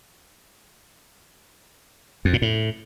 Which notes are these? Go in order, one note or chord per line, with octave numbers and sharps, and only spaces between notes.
F2
A#2
A2